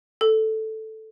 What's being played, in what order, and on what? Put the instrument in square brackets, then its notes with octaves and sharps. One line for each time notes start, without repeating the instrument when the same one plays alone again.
[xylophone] A4